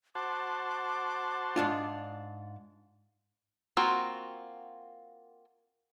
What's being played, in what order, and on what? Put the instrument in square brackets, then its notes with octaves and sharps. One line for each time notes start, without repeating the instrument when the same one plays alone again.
[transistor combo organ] F#4 C5 A5 [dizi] D6
[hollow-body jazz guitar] G#2 D4 F4
[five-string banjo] A#3 C4 F4 F#4